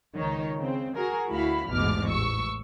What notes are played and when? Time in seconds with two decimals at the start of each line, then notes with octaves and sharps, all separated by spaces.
0.17 C#2 D#3 D#4 C#5
0.57 C#3 C4
0.96 F#4 G#4 A#4
1.30 D2 E4 F#4 F5 B5
1.69 A1 E2 G#2 B2 D6 F6
2.09 A1 C#6 E6 C#7